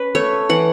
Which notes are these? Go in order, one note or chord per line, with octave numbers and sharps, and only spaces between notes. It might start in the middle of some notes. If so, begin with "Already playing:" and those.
Already playing: C#4 B4
A3 C#5
E3 F#5